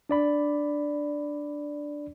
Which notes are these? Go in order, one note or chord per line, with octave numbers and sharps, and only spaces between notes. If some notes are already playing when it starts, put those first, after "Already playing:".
D4 D5 B5